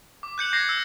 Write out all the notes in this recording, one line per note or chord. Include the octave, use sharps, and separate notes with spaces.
D6
F#6 G6 C#7 F#7
D6 G6 G#6 A#6 C7 C#7
E6